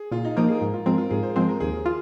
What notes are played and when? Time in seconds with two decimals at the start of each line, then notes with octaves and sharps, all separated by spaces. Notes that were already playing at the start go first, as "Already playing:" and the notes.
Already playing: G#4
0.12 A#2 F4
0.25 D#4
0.37 F3 A#3 D#4 A#4
0.49 G#4
0.61 G#2
0.74 F4
0.86 F3 G#3 C4 A#4
0.98 F4
1.11 G#2 G#4
1.23 C5
1.35 F3 G#3 C4 C5
1.49 A#4
1.60 D#2 G#4
1.86 F4